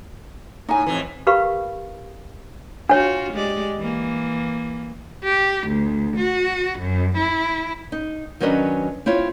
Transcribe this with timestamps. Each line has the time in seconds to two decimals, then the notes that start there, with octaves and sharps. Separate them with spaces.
0.69 A2 D#4 G#5
0.86 F2 A2 E3
1.27 G4 A#4 B4 F5 B5 C#6
2.89 D4 F4 F#4 C#5
3.33 G#3 G4 D5
3.78 E3 A#3
5.25 G4
5.68 D2
6.17 F#4
6.80 F#2
7.18 E4
7.92 D#4
8.40 D#3 F#3 C#4 D4 B4 D#5
9.06 C4 E4 F4 C#5